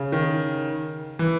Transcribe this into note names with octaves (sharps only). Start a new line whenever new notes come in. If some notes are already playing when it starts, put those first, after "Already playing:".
Already playing: C#3
D#3
E3